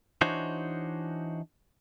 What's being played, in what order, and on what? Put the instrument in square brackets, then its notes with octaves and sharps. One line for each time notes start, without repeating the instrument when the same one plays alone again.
[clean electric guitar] E3 D4 D#4 F#4 C5 C#5